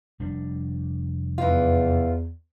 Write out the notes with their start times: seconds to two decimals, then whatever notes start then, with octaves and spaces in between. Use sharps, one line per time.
0.20 F1 G3 D4
1.38 E2 E3 F4